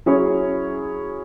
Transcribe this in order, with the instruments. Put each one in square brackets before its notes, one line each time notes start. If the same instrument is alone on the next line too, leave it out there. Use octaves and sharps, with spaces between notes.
[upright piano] F#3 C#4 E4 G#4 C#5